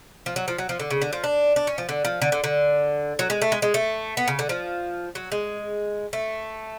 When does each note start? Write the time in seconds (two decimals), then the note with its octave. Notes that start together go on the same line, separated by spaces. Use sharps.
0.26 F3
0.36 F#3
0.48 F3
0.58 F#3
0.69 F3
0.80 D3
0.90 C#3
1.02 D3
1.13 F3
1.24 D4
1.56 D4
1.67 C#4
1.78 F3
1.89 D3
2.05 F3
2.22 D3
2.32 D3
2.44 D3
3.19 F#3
3.30 G#3
3.42 A3
3.52 G#3
3.62 G#3
3.74 A3
4.17 B3
4.28 C#3
4.39 D3
4.49 F3
5.15 F#3
5.32 G#3
6.13 A3